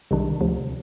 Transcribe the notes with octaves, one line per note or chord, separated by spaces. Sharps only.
C2 C3 D#3 G#3 D4
D2 C3 F3